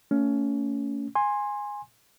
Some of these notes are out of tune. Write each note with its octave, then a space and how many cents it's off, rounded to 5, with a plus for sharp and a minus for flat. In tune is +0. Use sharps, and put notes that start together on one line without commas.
A3 +35 C#4 +20
G#5 -10 C6 +15